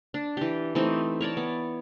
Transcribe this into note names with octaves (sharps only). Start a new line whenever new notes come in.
D4
E3 G4
E3 A3 C4 D#4
A#4 C#5 D5 A5
B3